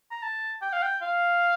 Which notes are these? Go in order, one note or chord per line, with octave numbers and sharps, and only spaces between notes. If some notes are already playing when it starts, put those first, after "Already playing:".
A#5
A5
G5
F5
G5
F5